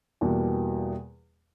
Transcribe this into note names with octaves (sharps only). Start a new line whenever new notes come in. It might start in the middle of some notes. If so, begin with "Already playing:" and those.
E2 B2 G3 A#3